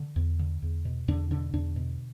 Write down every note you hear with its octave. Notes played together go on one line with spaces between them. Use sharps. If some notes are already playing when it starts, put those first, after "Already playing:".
Already playing: D3
E2
D3
E2
B2
E2 D3 D4
B2 D3 D4
E2 D3 D4
B2